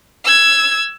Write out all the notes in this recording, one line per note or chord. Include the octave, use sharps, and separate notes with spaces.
E6 G#6